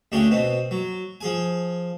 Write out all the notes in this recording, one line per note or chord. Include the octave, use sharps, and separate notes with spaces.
D2 C#3 D4 G5 C#6
B2 B3 C4
F#3
F3 G#4 G#5